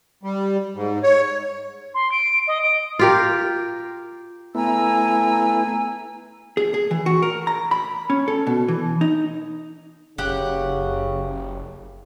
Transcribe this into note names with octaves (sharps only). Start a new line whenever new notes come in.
G3
G#2
C#5
C6
D7
D#5
D7
F4 G4 A#4
A3 B3 E4 G#5 A#5 E6
G#4
G#4
E3
F#4
A#4
A#5
B5
C#4
A4
B2
E3
D#4
F#1 C#3 G4 F#5